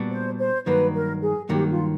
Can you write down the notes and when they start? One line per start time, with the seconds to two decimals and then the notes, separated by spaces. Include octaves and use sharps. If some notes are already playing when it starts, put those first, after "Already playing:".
Already playing: A#2 G3 B3 D4 F#4
0.11 C5
0.39 C5
0.66 G2 D#3 F#3 A#3 B4
0.94 A#4
1.22 G#4
1.49 G2 D#3 F#3 A#3 G4
1.70 F4